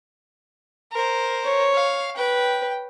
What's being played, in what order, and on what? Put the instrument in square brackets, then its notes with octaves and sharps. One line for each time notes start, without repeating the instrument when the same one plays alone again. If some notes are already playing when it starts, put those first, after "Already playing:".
[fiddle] A#4 C5
[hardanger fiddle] C#5
[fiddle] F5
[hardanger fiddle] B4 [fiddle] G5